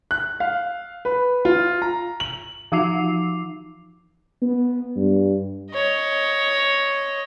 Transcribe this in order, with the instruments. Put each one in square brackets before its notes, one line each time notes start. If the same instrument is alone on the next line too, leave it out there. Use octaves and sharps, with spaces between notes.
[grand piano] F#6
F5
B4
F4
A#5
F#7
[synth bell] E3 F3 D#4 D6 C7 F7
[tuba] B3
G2
[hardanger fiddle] C#5 D#5